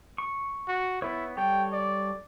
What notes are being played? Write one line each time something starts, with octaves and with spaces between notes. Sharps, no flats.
C#6
F#4
B3 E4 B4 C#5
G3 A4 C#5 G5
D5